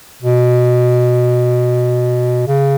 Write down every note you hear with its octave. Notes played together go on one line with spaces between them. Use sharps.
B2
C#3